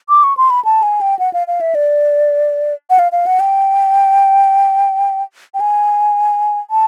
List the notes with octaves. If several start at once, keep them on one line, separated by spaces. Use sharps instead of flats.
D6
C#6
C6
B5
A5
G#5
G5
F#5
F5
F5
E5
D5
F#5
F5
F5
F#5
G5
G5
G#5
A5